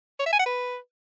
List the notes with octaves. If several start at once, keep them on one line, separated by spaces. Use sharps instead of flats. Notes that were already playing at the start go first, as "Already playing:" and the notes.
C#5
E5
G#5
F#5
B4